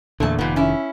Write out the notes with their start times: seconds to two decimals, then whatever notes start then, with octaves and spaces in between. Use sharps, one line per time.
0.20 E2 A#2 D3 A3 A5
0.39 F1 A#2 D#3 B3
0.56 C#4 E4